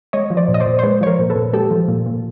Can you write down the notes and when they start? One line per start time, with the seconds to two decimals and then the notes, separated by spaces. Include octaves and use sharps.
0.13 G#3 C#5 D#5
0.30 F3
0.37 C5 D5
0.48 A#2
0.54 D#5
0.60 C5 D5
0.67 A#2
0.79 C5
0.83 G#3 B4 C#5
1.01 F3 C#5
1.07 A#4 C5
1.19 A#2
1.30 A4 B4
1.36 A#2
1.53 G#3 G4 A4
1.71 F3
1.88 A#2
2.06 A#2